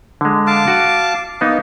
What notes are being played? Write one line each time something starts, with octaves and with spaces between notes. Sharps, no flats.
D3 G#3
F5 A5 D6
F#4
A#3 B3 D#4